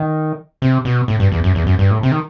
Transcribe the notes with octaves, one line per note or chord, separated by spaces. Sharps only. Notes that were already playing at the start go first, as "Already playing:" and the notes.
Already playing: D#3
C3
B2
A2
G2
E2
F#2
E2
F#2
G2
A2
C3
D#3